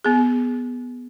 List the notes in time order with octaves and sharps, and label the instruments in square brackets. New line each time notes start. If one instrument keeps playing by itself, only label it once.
[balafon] B3 G#4